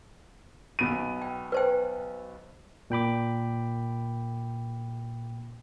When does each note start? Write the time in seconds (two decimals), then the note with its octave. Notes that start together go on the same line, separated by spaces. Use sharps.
0.79 B1 B3 D#7
1.22 G5
1.52 B4 C5 G5
2.90 A#2 G5 B5 D6